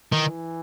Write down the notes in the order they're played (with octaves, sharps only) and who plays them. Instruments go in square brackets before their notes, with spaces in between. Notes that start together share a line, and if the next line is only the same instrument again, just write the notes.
[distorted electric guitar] D#3 [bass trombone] E3